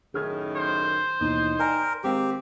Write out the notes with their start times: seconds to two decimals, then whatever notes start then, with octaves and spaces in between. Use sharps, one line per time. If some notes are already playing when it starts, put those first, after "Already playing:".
0.14 F#2 A2 D#3 G#4 F6 G#6
0.56 C5
1.20 D#2 B2 E3 D#4
1.60 A#4 D5 G5 G#5
2.04 D#3 G#3 C4 G4 F5